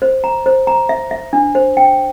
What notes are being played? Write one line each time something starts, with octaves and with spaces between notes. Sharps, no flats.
C5
A#5
C5
A#5
E5
E5
D4
C5
G5